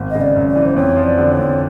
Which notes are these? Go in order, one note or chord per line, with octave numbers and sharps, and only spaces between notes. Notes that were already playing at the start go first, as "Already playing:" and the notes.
Already playing: G#1
C#3 D#5
D5
F#2
D5
E3
C5
F2 C#5
F3
D5
D3
C#5
F2